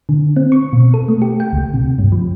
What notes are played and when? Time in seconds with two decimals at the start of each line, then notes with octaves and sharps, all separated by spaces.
0.09 D3
0.36 C4
0.52 C#6
0.73 B2
0.94 A4
1.08 A3
1.22 G4
1.40 G5
1.53 C#2
1.74 C3
1.99 G2
2.12 F3